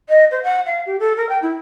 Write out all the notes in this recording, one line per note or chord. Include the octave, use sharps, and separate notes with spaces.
D#5
C5
F#5
F5
G4
A4
A#4
G5
E4